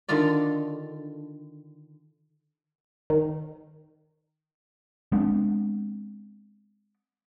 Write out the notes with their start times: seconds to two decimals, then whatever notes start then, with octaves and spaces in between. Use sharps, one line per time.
0.09 D3 D#3 F4 D5
3.10 D#3
5.12 G#3 B3 C4 D4